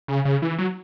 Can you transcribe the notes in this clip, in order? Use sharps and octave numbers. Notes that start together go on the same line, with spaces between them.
C#3
C#3
E3
F#3